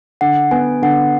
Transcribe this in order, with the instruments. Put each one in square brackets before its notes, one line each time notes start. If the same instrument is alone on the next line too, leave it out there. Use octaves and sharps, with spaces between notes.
[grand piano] D3 [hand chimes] F#5
[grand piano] B3 [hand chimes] G#5
[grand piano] D3 [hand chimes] F#5